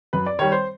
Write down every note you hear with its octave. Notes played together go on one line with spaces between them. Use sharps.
F#2 B4
D5
D#3 G3 C#5
C5